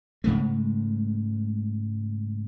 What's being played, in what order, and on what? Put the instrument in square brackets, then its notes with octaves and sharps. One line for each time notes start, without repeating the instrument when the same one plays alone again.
[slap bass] G#2 C#3 G#3 A3